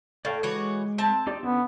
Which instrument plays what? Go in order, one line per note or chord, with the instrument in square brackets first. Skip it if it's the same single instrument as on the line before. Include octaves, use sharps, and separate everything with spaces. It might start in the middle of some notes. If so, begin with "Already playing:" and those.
[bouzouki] A2 [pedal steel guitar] D5 F5 G5
[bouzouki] E3 F#4 C#5 [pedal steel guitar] G#3 D6
[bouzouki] C4 A5
[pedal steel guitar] D#4 G4 D5
[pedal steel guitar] D3 C#4 E4 [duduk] B3